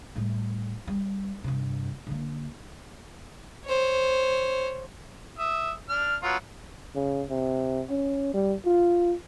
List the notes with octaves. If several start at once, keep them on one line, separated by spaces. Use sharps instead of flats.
A2 G3
G3
G2 C3
D3 A#3
C5 C#5
E5 D#6
D4 F6
F#3 B3 F4
C#3
C3
C#4
G3
F4